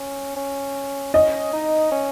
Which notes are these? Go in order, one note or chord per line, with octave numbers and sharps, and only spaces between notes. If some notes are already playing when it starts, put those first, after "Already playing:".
Already playing: C#4
C#4
C#4 D#5
D#4
C#4